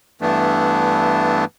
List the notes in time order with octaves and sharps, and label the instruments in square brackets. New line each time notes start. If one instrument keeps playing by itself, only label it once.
[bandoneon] G2 E3 A3 B3 D4